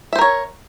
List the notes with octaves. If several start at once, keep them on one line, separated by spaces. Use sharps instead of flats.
A#4 C5 C#5 E5